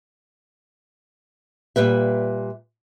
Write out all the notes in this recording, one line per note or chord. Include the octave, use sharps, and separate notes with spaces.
A#2 G3 B4 E5